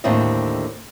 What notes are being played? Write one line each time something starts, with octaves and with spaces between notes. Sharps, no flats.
D#2 A2 D3 A3 C4 D#5